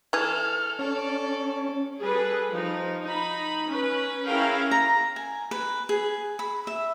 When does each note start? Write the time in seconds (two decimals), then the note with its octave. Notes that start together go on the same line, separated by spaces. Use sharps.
0.13 E3 G#4 A4 F6
0.79 C#4 A4 D5
1.99 G3 G#4 A4 B4
2.51 F3 D#4
3.02 D#4 B5
3.68 C#4 B4
4.26 C#4 E4 G#4 A#4 F5 G5
4.71 A#5
5.16 G#5
5.51 B4
5.89 G#4
6.39 B5
6.67 E5